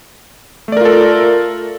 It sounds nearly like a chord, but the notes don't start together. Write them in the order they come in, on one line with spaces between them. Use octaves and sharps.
A3 D5 A#4 F4 A4